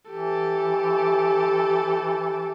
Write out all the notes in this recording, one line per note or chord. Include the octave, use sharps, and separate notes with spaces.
E3 G4 A4